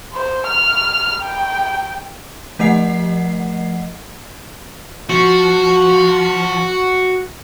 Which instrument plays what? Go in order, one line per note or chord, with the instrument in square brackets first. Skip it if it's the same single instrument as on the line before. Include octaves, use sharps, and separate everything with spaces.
[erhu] C5
F6
G5
[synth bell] F3 A3 D#5 F#5 C7
[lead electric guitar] F3 [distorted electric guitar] F#4